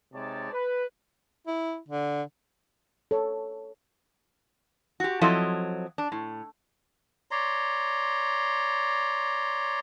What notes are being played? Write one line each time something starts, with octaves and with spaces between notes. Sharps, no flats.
C3 G#3 D#4 C#5 D5 A5
B4
E4
D3
A4 C#5
F#4 G4
F3 F#3 C4 E4 A4 D#5
D4
A2
C#5 D5 A#5 C6